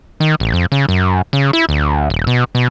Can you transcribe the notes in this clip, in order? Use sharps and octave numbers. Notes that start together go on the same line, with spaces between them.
D#3
A1
F2
C#3
F#2
C#3
E4
D2
D#1
B2
B2